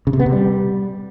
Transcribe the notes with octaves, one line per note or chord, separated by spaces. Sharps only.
C#3
C3
B3
C3
G3